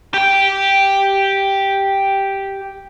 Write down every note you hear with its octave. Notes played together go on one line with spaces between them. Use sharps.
G4 G5